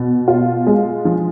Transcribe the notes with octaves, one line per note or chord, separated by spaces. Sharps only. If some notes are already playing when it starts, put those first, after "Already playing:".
Already playing: B2
F4
G#3
F3